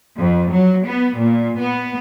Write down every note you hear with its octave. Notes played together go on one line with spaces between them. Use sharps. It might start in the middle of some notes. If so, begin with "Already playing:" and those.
F2
F#3
B3
A#2
B3